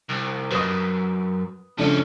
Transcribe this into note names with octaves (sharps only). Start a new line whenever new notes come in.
C2
F#2 B4 D#6
C#3 F3 A3 C#4 D4